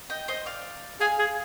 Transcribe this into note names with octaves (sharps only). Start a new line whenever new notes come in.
D#5 G5
C5 D#5
D5 F5
G#4 F5 G#5
G#4